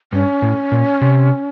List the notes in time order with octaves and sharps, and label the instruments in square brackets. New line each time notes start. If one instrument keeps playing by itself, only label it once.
[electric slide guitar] G2 [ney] C#4
[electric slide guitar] A2
A#2
C3